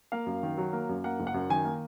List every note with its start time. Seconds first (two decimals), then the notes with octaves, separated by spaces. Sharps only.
0.12 A#3 F5
0.26 F#2
0.43 D#3
0.58 F#3
0.73 A#3
0.89 F#2
1.04 A#3 F#5
1.20 F#1
1.27 F#5
1.34 F#2
1.50 D#3 G#5
1.65 A#3